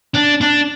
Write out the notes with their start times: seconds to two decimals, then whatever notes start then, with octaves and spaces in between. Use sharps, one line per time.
0.14 D4
0.41 D4